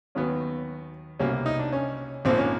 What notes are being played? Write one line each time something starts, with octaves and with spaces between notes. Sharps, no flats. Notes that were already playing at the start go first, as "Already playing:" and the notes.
D#2 D#3 F#3 B3 C#4
C2 B2 G3 A#3 C#4
D#4
D4
C#4
A#1 G#2 F3 A#3 C4
C#4